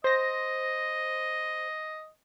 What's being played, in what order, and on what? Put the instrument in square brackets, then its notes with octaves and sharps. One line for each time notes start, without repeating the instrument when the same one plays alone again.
[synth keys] C5 A#6 [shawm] D#5